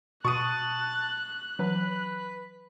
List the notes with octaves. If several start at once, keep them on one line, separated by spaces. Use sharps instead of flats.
B2 A5 C#6 D#6 F#6 D#7
E3 F#3 B4